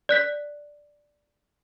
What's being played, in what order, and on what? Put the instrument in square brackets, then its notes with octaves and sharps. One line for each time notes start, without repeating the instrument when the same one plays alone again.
[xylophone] D5 F#6 B6